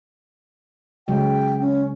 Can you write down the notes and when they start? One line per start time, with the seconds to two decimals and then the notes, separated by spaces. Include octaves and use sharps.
1.08 C#3 F#3 G#3 G5
1.60 C#4